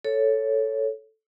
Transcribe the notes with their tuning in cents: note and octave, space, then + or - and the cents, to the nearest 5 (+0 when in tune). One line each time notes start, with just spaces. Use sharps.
A4 +0 C#5 +5